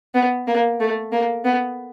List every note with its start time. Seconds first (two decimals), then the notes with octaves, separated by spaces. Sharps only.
0.14 B3
0.47 A#3
0.80 A3
1.12 A#3
1.45 B3